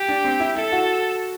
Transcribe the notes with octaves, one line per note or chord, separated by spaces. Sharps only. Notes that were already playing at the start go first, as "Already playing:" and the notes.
Already playing: G4
D4
C4
E4
E4 A4
F#4